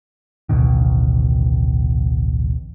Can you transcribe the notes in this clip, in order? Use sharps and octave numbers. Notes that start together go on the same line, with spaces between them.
A1 D2 B2 D#3